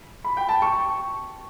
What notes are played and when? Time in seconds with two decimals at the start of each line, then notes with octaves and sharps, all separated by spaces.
0.24 B5
0.37 G5
0.49 A5
0.62 C#6